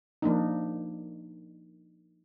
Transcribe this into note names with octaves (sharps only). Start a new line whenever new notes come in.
F3 A#3 D4 D#4